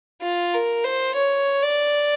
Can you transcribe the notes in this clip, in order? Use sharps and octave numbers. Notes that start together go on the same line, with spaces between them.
F4
A#4
C5
C#5
D5